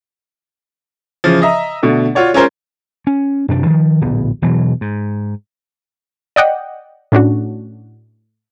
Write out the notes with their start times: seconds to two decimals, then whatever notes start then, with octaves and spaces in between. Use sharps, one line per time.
1.24 C#3 E3 F3
1.42 D#5 E5 A#5
1.83 B2 D3 A3
2.15 F4 F#4 C#5 D5
2.33 G#3 C#4 F4 A#4 C5
3.07 C#4
3.48 F#2 C3 D4
3.66 D#3 F3
4.01 D1 A#1 B3
4.42 E1 B2 E3 F#3
4.81 G#2
6.36 D5 D#5 F#5 G5
7.12 A2 C#4 D4 F#4